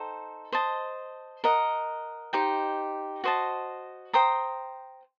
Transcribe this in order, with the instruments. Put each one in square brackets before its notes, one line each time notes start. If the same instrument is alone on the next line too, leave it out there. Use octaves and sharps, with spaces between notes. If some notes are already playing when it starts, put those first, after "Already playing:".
Already playing: [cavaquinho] D#4 A4 C5 G5
C5 D#5 A5
A#4 D#5 F#5
D#4 G4 C5 G5
F#4 C5 D#5 A5
C5 G5 A#5 D#6